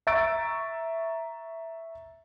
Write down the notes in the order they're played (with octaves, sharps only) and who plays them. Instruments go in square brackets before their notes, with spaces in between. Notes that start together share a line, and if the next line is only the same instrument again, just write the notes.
[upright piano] E5 A#5 C#6 E6 A6 D7